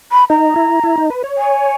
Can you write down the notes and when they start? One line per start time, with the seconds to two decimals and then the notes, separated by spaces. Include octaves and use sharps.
0.11 B5
0.29 D#4 A#5
0.56 E4
0.83 E4
0.98 D#4
1.10 B4
1.24 C#5
1.37 G#5